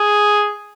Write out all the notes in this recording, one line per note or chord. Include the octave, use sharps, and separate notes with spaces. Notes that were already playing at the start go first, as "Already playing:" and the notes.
Already playing: G#4